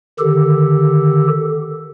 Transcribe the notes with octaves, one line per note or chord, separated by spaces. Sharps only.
D3 D#3 G4 A4